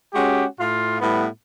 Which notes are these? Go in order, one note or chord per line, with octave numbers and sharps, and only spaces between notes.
G#3 C#4 F#4 G4
A2 F4
A2 G3 B3